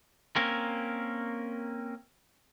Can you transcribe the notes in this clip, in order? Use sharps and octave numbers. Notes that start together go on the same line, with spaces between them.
A#3 C4 C#4 A#4